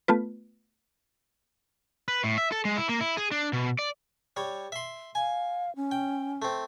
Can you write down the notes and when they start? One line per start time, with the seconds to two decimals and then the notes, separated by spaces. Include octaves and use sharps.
0.08 A3 B3 F4 B4
2.08 B4
2.24 A2
2.38 E5
2.52 A4
2.65 G#3
2.77 E4
2.89 A#3
3.01 E4
3.17 G#4
3.31 D4
3.53 B2
3.79 D5
4.37 G3 C#5
4.72 E5 C6
5.15 F5 G#5
5.76 C#4
5.91 G5
6.42 A3 C4